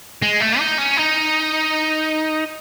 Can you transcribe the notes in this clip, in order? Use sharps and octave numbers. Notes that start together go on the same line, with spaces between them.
G#3
A3
D#4
C#4
D#4